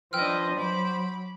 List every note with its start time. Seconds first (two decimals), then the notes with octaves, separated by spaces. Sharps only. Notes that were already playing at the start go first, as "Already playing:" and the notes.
0.13 F3 D4 B4 C5 D#5 G5 E6 F6
0.58 F#3 B5 D6